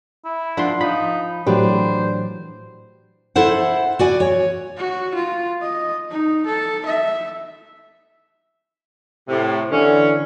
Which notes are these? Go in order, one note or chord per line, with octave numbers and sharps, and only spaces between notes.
E4
F3 D4 F#5 B5 C6
F3 D#4 B5
A2 E3 F#3 D4 G4 B4 C5
E4 A4 C5 F#5
F#4 D5 G#5
C#5
F#4
F4
D#5
D#4
A4
E5
A2 C3
D3 E3 C#4